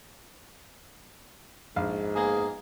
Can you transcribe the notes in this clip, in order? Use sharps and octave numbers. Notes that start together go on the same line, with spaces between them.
A#1 G#2 F5
A#3 B3 G#4